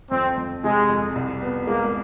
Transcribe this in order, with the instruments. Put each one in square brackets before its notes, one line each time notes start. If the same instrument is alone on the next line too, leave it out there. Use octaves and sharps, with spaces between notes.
[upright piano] F2 [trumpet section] C4
[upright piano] F2
[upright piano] C3 [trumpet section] G#3
[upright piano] F2
C2
B3
[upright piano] G#3 [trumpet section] A#3